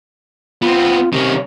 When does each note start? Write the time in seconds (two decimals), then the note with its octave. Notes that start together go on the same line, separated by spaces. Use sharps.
0.62 B3 C4 F4
1.13 C3 D#3 C#4